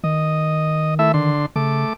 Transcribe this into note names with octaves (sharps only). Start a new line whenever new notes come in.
D#3 D#5
A3 E4 E5
D3 C6
C#3 A3 D6